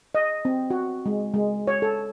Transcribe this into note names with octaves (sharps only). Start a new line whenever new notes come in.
D#5
C4
F#4
G#3
G#3
C#5
A4